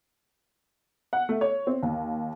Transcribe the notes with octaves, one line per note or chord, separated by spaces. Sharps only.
F#5
A3
C#5
C4
D#2